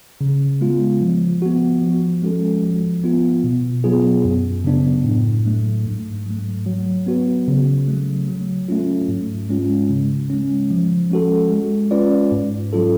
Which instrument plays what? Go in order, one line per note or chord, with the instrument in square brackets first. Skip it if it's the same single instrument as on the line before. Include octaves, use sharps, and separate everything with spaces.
[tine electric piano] C#3
G#3 B3 F4
F3
B3 F#4
F3
G#3 C#4 F#4 A4
F3
B3 F4
B2
F#3 B3 F4 G#4
F#2
C#3 F#3 B3 D4
A2
F#3 A3 D4
G#2
F#3 A3
F#3
B3 F#4 B4
C#3
F#3 A3
F#3
A3 C#4 F4
G#2
G#3 C#4 F4
C#3
G#3 C#4
F3
G#3 C#4 F#4 A4
G#3
C#4 F4 B4 D5
G#2
F#3 C#4 F4 A4